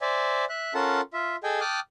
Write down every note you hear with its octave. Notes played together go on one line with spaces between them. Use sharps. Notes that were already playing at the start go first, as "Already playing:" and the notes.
C5 D5 E5 G#5
E5 F#6
C#4 F4 A4 A#4 F#5 A5
F4 E5
G#4 A4 D#5 G5 G#5
G5 A5 D6 D#6 F6 F#6